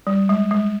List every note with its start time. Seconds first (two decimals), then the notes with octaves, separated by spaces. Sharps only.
0.07 G3
0.29 G#3
0.51 G#3